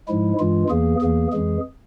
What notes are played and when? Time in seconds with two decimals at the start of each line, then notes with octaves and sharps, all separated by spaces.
0.08 G#2 F3 G#3 E4
0.39 G2 E3 G#3 F4
0.70 E2 E3 A#3 G#4
1.01 E2 E3 A#3 G#4
1.33 F2 E3 G#3 G#4